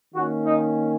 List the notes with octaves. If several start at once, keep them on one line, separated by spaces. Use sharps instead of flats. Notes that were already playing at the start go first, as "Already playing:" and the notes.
D#3 A#3 C#4 F#4
D#4